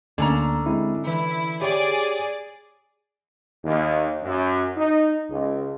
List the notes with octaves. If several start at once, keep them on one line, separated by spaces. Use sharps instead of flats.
D2 D3 A#3 C#4 A#5
G#3 C4 E4
E3 E4
G4 G#4 C#5 D5
D#2
F#2
D#4
C#2